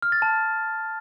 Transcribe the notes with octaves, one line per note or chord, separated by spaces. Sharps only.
F6
A6
A5